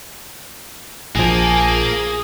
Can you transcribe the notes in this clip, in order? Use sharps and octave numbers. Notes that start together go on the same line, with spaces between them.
A#1 F3 A#3 G#4